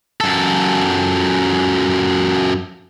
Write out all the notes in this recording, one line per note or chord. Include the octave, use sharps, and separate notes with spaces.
F#2 A4